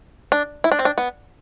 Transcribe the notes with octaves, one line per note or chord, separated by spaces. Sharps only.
D4
E4
D4
C4
D4
B3